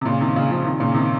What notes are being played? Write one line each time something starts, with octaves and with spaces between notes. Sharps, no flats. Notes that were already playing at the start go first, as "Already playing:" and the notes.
C3
A#2 C#3
C3 D#3
A#2 C#3
C#3 F3
C3 D#3
A#2 C#3
C3 D#3